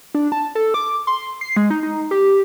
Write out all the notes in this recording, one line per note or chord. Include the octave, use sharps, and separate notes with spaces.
D4
A5
A4
D6
C6
C7
G#3
D#4
D#4
G4